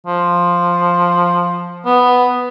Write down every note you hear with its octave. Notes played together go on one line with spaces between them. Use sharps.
F3
B3